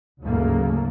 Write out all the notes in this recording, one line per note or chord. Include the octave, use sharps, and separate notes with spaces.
D2 G#2 C#3 F#3 A3 A#3